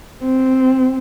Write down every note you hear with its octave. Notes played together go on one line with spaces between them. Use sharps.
C4